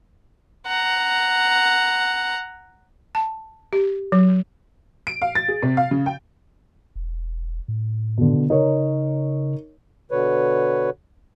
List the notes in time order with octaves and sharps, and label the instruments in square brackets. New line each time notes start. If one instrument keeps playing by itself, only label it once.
[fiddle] F#5 A#5
[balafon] A5
G4
F#3
[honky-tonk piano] D7
F5
A6
G#4
C3
F5
C#3
G5
[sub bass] E1
A2
[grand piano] B2 D3
[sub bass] C#3 [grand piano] D#4 A#4 C#5
[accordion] B2 D3 B4 C#5